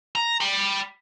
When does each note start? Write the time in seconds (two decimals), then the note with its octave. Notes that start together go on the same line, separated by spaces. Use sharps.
0.15 A#5
0.41 G5 B5